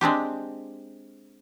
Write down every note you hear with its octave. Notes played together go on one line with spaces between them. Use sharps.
G#3 C4 D4 G4